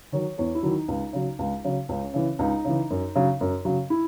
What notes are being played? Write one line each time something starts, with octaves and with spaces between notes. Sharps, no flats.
D#3 F#3 C#5
E2 C#5
E4
D#3 F#3
D#4
C#2
C#3 F#3
C#2
C#3 F#3
C#2 C#4
C#3 E3
C#2 D#4
C#3 E3
F#2
C#3 F#3
F#2
C#3 F#3
E4